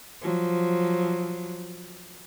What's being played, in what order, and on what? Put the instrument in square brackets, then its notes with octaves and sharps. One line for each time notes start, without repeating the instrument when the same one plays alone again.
[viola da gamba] F3 F#3